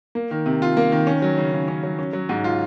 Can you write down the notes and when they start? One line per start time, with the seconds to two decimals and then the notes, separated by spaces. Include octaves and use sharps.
0.15 A#3
0.31 D#3
0.46 C3
0.62 F4
0.77 A#3
0.92 D#3
1.07 C#4
1.22 F#3
1.38 C#3
1.53 C#3
1.68 C#4
1.83 F#3
1.99 C#4
2.13 F#3
2.29 G#2
2.44 F4